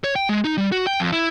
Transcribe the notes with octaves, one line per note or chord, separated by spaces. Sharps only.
C#5
G5
G#3
D#4
G3
F#4
G5
F2
E4